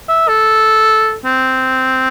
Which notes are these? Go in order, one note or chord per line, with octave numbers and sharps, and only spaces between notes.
E5
A4
C4